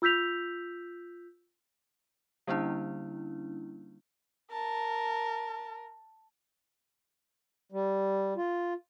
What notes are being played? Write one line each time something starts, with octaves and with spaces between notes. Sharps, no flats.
F4 E6 G6 B6 F7
D3 G3 A#3 C#4 D4 E4
A#4 A5
G3
F4